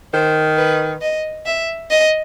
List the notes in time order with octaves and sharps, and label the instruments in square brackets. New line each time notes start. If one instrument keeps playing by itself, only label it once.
[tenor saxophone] D#3 [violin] C5
[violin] B4
D#5
E5
D#5